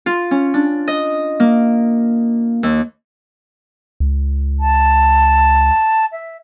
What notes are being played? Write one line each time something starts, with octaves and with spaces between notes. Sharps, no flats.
F4
C#4
D4
D#5
A#3
D#2
C#2
A5
E5